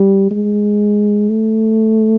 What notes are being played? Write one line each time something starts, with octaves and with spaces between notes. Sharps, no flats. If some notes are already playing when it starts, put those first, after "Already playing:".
Already playing: G3
G#3
A3